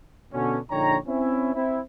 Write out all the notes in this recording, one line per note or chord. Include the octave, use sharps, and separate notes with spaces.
B2 D3 C#4
A#1 D3 D#4 C#5 G5 A#5
C4 C#4 E4
C4 E4